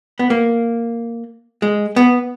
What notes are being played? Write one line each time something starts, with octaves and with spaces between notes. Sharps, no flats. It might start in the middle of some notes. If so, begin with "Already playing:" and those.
B3
A#3
G#3
B3